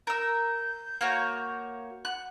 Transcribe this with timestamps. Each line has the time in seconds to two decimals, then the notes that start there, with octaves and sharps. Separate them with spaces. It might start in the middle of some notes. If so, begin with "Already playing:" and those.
0.07 A#4 E6 G6
1.01 A#3 F#4 C#5
2.05 F#5 F#6